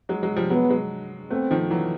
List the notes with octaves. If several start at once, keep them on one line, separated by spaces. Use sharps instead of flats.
F#3 G#3
F#3 G#3
F3 G3
F#3 G#3 B3
F#3 G#3
A3 B3 C4
D#3 F3
E3 F#3